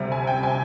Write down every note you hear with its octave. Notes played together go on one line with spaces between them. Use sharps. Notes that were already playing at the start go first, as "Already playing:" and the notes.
Already playing: D2 C3 G3
G#5
G5
G#5